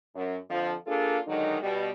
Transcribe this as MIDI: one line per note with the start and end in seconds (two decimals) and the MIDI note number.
0.15 0.37 42
0.50 0.73 41
0.50 0.73 50
0.50 0.73 53
0.87 1.18 58
0.87 1.18 62
0.87 1.18 65
0.87 1.18 68
0.87 1.18 69
1.27 1.58 50
1.27 1.58 51
1.27 1.58 54
1.27 1.58 56
1.27 1.58 63
1.62 1.90 47
1.62 1.90 55